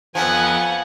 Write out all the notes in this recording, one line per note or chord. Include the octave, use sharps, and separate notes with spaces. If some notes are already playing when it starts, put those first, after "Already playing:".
F2 F3 B3 F#5 G#5